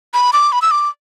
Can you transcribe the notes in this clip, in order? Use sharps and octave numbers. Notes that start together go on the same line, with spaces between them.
B5
D6
B5
E6
D6